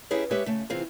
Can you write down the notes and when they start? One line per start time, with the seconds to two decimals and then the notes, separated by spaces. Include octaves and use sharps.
0.11 C#4 D#4 E4 G4 G#4 B4
0.31 G#3 G4 B4 C#5 E5
0.46 C#3 A3
0.70 C3 E3 C4 F4 G#4